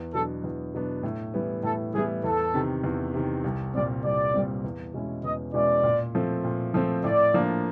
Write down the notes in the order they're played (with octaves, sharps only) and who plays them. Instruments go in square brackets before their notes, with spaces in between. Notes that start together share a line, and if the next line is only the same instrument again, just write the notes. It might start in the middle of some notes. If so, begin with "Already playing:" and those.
Already playing: [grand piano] E2
[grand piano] B2 F#3 B3 D4 [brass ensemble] A4
[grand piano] E2
B2 F#3 B3 D4
A2
E3 G3 B3 E4
[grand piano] A2 [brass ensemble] A4
[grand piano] E3 G3 B3 E4 [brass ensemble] G#4
[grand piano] E2 [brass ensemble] A4
[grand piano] C3 D#3
E2
C3 D#3
C2
[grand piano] A#2 G3 C4 [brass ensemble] D5
[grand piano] C2 [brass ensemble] D5
[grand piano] A#2 G3 C4
E2
B2 G#3 C#4 E4
[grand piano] E2 [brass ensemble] D#5
[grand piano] B2 G#3 C#4 E4 [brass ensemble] D5
[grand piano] A#2
F3 A3 C4
A#2
F3 A3 C4
[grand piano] A2 [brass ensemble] D5
[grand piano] F3 A#3 D4